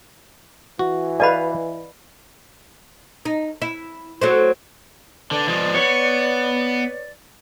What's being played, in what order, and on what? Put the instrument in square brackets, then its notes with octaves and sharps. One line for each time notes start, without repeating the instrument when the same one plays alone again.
[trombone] E3 [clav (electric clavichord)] F#4
[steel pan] B4 F5 G#5 [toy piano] D5 D#5 B5
[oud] D#4
E4
F#3 A3 C4
[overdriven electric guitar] D3 [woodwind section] B4 D5
[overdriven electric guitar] F3 G#3
[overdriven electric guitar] B3 [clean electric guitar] C#5